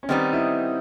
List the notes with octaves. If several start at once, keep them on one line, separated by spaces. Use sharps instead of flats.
C#4
D#3 G3 B3 C4 D#4
E4